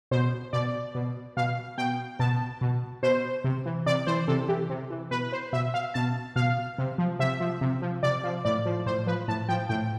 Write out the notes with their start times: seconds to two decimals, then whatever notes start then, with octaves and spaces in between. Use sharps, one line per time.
0.11 B2 C5
0.53 B2 D5
0.95 B2
1.37 B2 F5
1.78 B2 G5
2.19 B2 A5
2.61 B2
3.03 B2 C5
3.44 C3
3.66 E3
3.86 C3 D5
4.07 E3 C5
4.28 C3 A4
4.48 E3 G4
4.70 C3
4.90 E3
5.11 B2 B4
5.33 C5
5.53 B2 E5
5.74 F5
5.94 B2 A5
6.36 B2 F5
6.78 C3
6.98 F3
7.19 C3 E5
7.40 F3
7.61 C3
7.82 F3
8.03 C3 D5
8.23 F3
8.45 A2 D5
8.66 F3
8.86 A2 C5
9.06 F3 B4
9.28 A2 A5
9.49 F3 G5
9.69 A2 G5